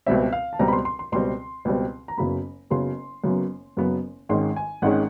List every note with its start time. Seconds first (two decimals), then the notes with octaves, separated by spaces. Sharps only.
0.06 C#2 B2 G3 C4 E5
0.33 F5
0.53 A5
0.59 C#2 B2 G3 C4 A#5
0.68 B5
0.73 C6
0.85 C6
0.99 C6
1.12 C#2 B2 G3 C4 C6
1.65 C#2 B2 G3 C4
2.08 A#5
2.17 F#1 F#2 C#3 F#3 B3 B5
2.70 F#1 F#2 C#3 F#3 B3 C6
3.23 F#1 F#2 C#3 F#3 B3
3.77 F#1 F#2 C#3 F#3 B3
4.29 G#1 G#2 D#3 G#3 C#4 C6
4.56 G#5
4.82 G#1 G#2 D#3 G#3 C#4 F#5